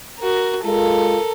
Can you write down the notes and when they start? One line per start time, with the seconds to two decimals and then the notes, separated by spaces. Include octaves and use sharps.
0.19 F#4 A#4
0.64 G#3 F4 A4 A#4